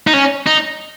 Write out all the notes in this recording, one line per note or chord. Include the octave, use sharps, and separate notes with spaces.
D#4
C#4
D#4